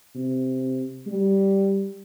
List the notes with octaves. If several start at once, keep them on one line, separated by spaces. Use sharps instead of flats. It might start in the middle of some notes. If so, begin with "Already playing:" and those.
C3
G3